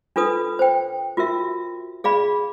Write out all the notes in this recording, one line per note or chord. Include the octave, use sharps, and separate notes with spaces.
D4 F4 A4 B4 D#6
C5 G5
F4 F#4 A#4 E5
G#4 D5 F5 B5